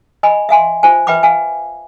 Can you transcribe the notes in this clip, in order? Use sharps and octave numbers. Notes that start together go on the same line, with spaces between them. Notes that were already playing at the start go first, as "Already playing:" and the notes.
D#5 G#5 B5
E5 F5 G#5 C6
F4 C5 G#5
B4 E5 G5 B5 D6
F5 G#5